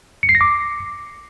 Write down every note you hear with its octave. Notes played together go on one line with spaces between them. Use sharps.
C#7
C7
A#6
D6